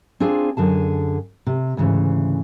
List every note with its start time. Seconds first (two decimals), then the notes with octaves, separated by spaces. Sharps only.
0.20 C4 D4 F4 G#4 C5
0.57 F#2 D3 G#4 A5
1.47 C3
1.77 D2 G#2 C#3 E3